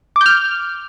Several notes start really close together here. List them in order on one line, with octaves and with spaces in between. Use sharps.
D6 G6 F6